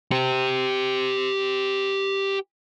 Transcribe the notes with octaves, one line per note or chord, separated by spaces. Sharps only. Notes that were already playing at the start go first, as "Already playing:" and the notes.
G4 C5